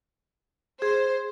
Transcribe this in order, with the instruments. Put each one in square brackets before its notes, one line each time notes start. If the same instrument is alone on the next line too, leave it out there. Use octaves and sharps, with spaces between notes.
[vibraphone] G#4 [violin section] C5